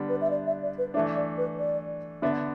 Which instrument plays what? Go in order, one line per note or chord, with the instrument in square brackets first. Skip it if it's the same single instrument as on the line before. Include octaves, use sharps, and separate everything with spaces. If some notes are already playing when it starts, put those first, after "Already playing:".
Already playing: [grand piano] D3 G3 B3 D4
[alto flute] B4
E5
D5
E5
D5
B4
[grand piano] E3 A3 D4 [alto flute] E5
[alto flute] D5
B4
D5
[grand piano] D3 B3 D4 [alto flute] E5